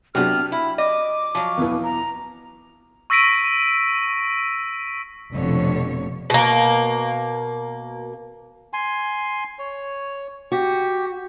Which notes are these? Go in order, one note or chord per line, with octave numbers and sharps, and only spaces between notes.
C3 F#3 B3 D4 G4 F6
E4 B5
D#5 D6
F3 F#3
E2 B2 E3
A#5
C#6 E6 A#6 B6 D7 D#7
F1 F2 B2 D3 C#5
B2 A#3
G#5 C6
C#5
F#4 G4